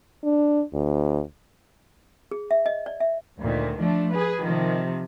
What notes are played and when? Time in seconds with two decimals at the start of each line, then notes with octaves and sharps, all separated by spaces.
0.24 D4
0.73 D2
2.31 G#4
2.51 E5
2.66 D#5
2.86 D5
3.00 E5
3.39 D2 A#2 D#3
3.80 F3 A3 D4
4.13 G#4 B4
4.42 C3 D#3 F3